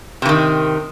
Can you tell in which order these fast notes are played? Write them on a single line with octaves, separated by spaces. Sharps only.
C3 E3 D#3